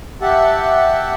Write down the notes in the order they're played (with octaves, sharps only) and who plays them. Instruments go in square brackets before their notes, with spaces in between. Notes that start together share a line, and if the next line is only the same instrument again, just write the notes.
[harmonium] G4 E5 F#5 A5